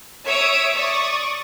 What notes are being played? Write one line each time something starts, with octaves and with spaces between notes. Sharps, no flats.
C#5 E5 D#6 E6 D7
D5 C#6 D#6